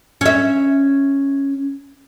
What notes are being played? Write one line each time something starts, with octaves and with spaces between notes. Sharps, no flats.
C#4 E5